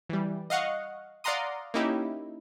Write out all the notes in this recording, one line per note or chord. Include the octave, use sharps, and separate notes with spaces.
E3 G3
D#5 F5 F#5 C#6
D5 F5 F#5 A#5 C6 D#6
A#3 C#4 D#4 E4 G4